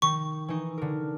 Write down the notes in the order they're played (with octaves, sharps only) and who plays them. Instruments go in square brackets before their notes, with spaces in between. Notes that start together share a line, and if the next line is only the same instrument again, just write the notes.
[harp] D#3 [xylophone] C#6
[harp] E3 D#4
D3 A#4